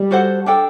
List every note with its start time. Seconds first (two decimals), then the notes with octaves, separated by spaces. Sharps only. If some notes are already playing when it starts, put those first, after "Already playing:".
Already playing: G3
0.11 F#4 A4 C5 F#5
0.46 D4 A4 D5 G5